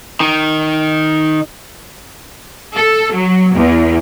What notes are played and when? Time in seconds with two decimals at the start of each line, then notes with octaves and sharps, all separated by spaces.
0.20 D#3
2.76 A4
3.14 F#3
3.56 E2